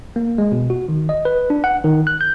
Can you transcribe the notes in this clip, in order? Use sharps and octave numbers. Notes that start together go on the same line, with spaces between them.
A#3
G#3
B2
F#4
D#3
D#5
B4
D4
F#5
D#3
F#6
G6